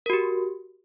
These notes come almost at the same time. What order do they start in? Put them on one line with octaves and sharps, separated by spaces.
A#4 F#4 G4